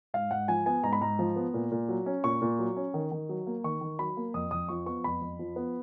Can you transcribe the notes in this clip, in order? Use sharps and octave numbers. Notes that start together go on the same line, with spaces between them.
G#2 F5
G#2 F#5
F3 G#5
B3 G#5
G#2 A#5
B5
G#2 A#5
F3
B3
A#2
A#2
F#3
C#4
A#2 C#6
A#2
F#3
C#4
D#3
D#3
F#3
A#3
D#3 C#6
D#3
F#3 B5
A#3
F2 D#6
F2 D#6
F3 C#6
B3 C#6
F2 B5
F2
F3
B3